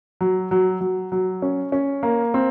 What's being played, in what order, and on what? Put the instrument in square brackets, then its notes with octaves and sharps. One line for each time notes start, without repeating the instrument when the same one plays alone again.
[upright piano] F#3
F#3
F#3
F#3
C#4
C#4
A#3
C4